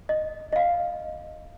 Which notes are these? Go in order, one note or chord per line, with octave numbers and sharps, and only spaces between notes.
D#5
D#5
F5